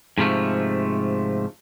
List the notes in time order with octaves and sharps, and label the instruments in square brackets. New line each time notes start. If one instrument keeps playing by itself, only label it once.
[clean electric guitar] G#2 C3 F3 A3